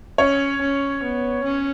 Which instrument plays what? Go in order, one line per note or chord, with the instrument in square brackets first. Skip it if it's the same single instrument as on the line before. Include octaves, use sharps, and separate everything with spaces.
[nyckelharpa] C#4 [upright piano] C#5
[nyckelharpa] C#4
B3
C#4